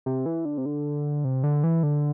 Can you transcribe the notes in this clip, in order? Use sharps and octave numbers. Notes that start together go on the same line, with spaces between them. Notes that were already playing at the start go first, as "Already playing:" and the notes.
C3
E3
D3
C3
D3
C3
D3
E3
D3